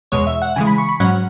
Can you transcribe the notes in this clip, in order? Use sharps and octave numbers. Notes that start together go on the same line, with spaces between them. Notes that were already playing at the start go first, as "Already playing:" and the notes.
E2 B2 G#3 C#5
E5
F#5
C#3 E3 G#3 G#5
B5
C#6
B5
G#2 F#3 C#4 F#5